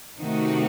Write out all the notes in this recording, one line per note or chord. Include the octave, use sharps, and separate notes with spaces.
C3 D#3 A3 D#4 F#4